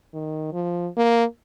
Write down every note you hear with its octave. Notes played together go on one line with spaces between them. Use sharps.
D#3
F3
A#3